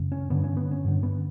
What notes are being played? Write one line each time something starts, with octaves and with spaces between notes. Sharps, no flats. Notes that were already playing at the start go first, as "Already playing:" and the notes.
Already playing: F#2 C#3
C#4
G2 D3 B3
C#4
B3
C#4
G2 D3
B3